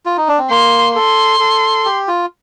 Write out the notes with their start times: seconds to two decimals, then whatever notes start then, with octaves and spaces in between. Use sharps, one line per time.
0.06 F4
0.17 D#4
0.28 D4
0.39 C4
0.50 A#3 C6
0.95 A4 C6
1.40 A4
1.85 G4
2.08 F4